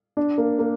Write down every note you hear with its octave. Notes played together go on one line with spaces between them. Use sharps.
D4
A#3
A#3